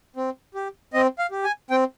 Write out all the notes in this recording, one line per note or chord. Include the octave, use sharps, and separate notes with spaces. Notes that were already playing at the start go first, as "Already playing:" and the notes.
C4
G4
C4 D#5
F5
G4
G#5
C4 G5